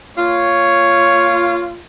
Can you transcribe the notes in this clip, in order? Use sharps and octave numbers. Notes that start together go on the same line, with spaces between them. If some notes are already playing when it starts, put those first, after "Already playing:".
A#2 F4 C#5